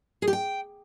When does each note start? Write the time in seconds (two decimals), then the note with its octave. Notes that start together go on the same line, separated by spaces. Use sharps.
0.22 G#4
0.28 G4
0.33 G5